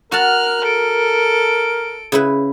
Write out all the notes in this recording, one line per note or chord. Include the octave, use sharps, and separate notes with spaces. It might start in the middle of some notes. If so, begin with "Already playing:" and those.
F#4 A#4 A5 F6 F#6
A4 D7
C#3 E4 B4